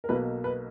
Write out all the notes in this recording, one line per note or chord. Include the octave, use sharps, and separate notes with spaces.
A#4
B1 B2 A#3 B4
B4